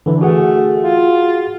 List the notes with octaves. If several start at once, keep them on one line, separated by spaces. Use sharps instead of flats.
D3 E3
A3 F#4 G#4 F#5
F4